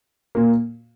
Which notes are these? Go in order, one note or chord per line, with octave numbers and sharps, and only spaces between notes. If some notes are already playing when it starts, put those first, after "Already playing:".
A#2 A#3